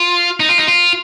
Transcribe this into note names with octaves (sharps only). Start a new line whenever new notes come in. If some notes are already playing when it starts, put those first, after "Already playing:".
Already playing: F4
D#4
F4
D#4
F4